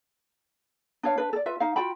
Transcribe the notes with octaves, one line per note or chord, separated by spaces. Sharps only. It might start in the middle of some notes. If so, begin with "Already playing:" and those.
D4 B4 C#5 F5
D4 B4
A4 D5
F4 B4 E5
D#4 F5
F4 F#4 G5 B5